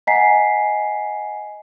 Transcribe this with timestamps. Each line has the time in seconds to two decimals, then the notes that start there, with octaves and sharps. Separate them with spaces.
0.07 D#5 F#5 G#5 A#5 B6 C7